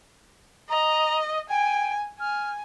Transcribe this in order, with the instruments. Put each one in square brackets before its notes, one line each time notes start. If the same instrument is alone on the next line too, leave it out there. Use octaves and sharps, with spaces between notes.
[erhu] D#5 [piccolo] A#5
[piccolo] G5 [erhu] G#5
[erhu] G#5 [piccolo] F6